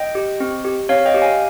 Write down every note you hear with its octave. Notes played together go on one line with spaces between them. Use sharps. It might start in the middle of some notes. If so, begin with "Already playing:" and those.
Already playing: D#5 G5
G4
C4
G4
C4 C#5 F5
D#5 G5
G4
F5 G#5